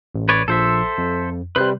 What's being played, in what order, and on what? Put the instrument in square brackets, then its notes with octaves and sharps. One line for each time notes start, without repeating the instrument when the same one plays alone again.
[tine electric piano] A1
[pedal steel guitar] B4 C#5 D5
[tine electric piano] A#1 F3 [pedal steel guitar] A4 C5 E5
[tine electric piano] F2
[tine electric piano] C3 G3 [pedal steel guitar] B4 C5 F#6